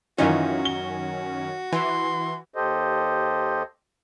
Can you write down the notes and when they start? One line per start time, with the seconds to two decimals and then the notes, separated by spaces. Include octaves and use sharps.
0.18 F#2 D#3 E3 C#4 D#4 F4 F#4
0.65 G7
1.73 E3 C6
2.54 D#2 G4 A4 C5 D#5